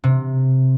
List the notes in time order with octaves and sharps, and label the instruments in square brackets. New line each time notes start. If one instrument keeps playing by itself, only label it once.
[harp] C3